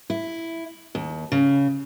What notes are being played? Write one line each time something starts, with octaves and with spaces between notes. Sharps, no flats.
E4
D#2
C#3